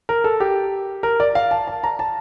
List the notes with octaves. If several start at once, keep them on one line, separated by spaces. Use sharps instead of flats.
A#4
A4
G4
A#4
D5
F5
A5
A5
A#5
A5